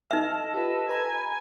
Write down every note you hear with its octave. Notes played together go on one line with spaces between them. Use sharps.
D#4 A4 D#5 E5 A5 F6
F4 G4 B4
B4 G#5 A#5 B5